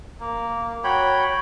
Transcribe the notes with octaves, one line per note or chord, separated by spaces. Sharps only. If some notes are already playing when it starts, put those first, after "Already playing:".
A#3
F#4 C#5 G5 B5